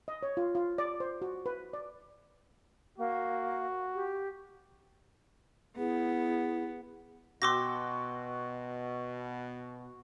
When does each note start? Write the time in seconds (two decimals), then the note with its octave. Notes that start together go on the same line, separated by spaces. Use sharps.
0.08 D#5
0.23 C#5
0.37 F4
0.55 F4
0.78 D5
1.00 C5
1.22 F#4
1.46 B4
1.73 D5
2.98 A#3 F#4
3.95 G4
5.78 B3 E4 G#4
7.42 B2 F#4 G5 C6 D6 E6 A#6